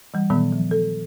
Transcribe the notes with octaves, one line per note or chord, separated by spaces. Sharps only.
E3 G3
A#2 D#3 F#3 B3
F3
A4